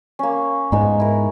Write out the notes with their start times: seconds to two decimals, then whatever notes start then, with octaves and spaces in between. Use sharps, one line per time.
0.19 A#3 C#4
0.72 G#2 G#3 B3 D#4
1.00 E4 A#4